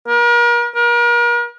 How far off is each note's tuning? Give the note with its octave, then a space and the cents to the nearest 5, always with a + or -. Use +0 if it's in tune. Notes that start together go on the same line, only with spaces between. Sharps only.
A#4 +40
A#4 +40